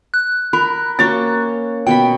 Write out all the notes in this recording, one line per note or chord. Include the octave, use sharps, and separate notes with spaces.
F#6
A#4 B5
A#3 C#4 F#4 C#5 G5 A6
B2 B3 G5 B5